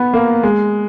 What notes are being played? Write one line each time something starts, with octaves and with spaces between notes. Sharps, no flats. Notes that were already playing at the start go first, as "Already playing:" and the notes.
Already playing: B3
A#3
G#3